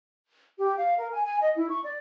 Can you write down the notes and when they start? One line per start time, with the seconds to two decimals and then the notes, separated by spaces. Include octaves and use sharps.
0.58 G4
0.78 F5
0.97 A#4
1.13 G#5
1.25 G#5
1.40 D#5
1.55 E4
1.70 C#6
1.84 D5